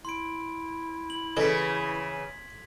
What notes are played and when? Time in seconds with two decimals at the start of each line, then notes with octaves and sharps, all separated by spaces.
0.05 E4 C6 D7
1.10 F#7
1.37 C#3 E3 D#4 A4 D#5 G#6 B6